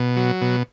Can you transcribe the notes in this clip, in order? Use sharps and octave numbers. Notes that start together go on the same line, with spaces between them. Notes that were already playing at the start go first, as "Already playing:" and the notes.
Already playing: B2
F#3
B2